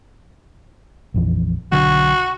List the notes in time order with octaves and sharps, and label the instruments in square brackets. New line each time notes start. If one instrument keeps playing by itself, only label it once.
[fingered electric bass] A#1 F2 E3
[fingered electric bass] B1 D3 F#3 [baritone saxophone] F#4